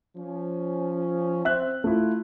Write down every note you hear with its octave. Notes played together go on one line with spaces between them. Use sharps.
F3 C#4
C4 E5 F#6
A3 E4 F4